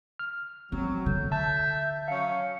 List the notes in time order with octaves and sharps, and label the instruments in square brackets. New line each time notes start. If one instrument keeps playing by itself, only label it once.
[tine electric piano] F6
[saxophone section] F#3 [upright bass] C4
[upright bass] D3 [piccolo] G6
[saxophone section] E5 [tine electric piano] A5 [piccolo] G6
[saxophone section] F#3 C#4 [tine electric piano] F5 [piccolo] C#7